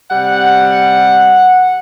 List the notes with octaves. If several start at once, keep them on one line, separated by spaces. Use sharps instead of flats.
C3 G3 F#5